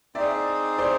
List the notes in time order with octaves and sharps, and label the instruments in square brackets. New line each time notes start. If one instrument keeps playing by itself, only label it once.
[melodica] C4 D#4 G#4 [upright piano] D5 E5
[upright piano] C5 D5